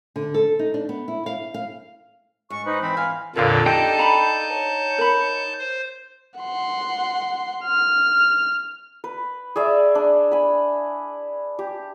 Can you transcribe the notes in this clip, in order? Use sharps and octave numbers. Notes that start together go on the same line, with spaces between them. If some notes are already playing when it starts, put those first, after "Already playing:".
D3
A4
D#4
D4
B3
E4
F5
F5
G#2 C#6
D#4 B4 C5
E3 C4 B5
F5 G#5
F2 A#2 D3 D4 A4 A#4 C#5 F5
D#4 G4 G5 A5 G6
F5 A#5 B5
C#5
A#4 B5
C5
F#5 C6
F6
B4
G#4 D5 E5
D4
G#5 B5
G4